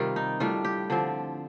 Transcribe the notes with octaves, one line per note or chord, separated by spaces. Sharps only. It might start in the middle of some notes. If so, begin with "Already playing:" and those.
Already playing: C3 D#3 G3 F4
D#4
A2 G3 D4 F4
G4
D3 F3 C4